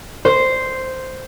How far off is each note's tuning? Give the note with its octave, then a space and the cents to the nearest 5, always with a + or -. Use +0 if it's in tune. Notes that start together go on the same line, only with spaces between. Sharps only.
C5 -5